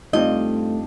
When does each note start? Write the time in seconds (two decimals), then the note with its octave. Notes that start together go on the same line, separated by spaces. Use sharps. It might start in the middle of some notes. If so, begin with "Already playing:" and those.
0.13 G2 A3 C4 D#4 F4 D#5